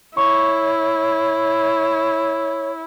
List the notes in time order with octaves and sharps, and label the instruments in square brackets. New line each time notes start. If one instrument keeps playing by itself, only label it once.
[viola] E4 [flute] C#5 [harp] C#6